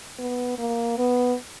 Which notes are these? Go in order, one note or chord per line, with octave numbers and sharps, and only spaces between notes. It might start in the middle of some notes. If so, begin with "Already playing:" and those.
B3
A#3
B3